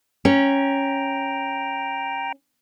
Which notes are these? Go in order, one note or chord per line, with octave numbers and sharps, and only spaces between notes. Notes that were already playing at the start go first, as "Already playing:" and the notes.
C#4 G5 A#5